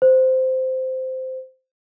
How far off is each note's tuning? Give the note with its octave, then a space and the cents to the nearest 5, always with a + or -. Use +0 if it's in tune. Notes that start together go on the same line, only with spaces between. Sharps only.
C5 -10